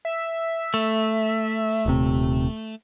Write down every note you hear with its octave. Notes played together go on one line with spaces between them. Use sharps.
E5
A3
D#1 C3